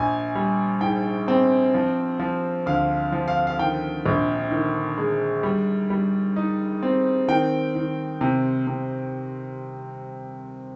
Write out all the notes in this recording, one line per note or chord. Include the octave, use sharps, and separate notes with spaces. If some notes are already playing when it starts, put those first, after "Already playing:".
Already playing: A#1 G#5
G3
G#2 G5
C4 G5
F3
F3
D2 F5
F3
F5
F5
D#3 G5
A#1
D#3
G#3
G3
G3
D#4
C4
D#3 G5
D#3
C3
C3